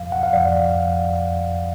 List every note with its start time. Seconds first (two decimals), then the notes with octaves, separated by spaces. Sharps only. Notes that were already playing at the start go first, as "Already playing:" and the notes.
Already playing: F2 F3 F5
0.12 F#5
0.23 F5
0.33 F2 F3 D5